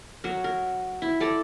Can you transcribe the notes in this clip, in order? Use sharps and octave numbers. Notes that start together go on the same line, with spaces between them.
F#3 A#4
A#4
E4
A4 D5 A5 A#5